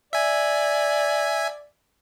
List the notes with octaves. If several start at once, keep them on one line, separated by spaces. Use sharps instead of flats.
D5 E5 G#5